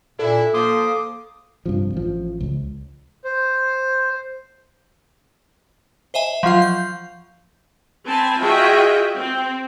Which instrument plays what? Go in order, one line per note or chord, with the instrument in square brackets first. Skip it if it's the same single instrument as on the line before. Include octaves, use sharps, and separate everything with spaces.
[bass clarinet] A#2 [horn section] D4 E4 [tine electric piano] A4
[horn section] F3 C6 [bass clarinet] A#3 [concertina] D6 D#6
[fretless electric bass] G2 C3 F3
A1 F3
C#2
[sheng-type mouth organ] C5
[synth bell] C5 D#5 E5 G#5
F3 F#3 F4 F5
G6
[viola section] C4 G#5 A5 B5
F4 F#4 G#4 D#5 E5 G5
C4